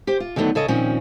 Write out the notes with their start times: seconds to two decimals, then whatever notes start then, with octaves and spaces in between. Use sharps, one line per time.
0.07 G4 C5
0.20 F4
0.36 D3 D#3 F#3 A3 B3
0.55 C#3 A4 C#5 D#5
0.68 A#2 D#3 F3 C4 C#4